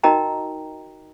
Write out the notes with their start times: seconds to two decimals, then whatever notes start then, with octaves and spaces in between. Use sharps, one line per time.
0.03 D#4 F#4 A#4 D#5 G5 A#5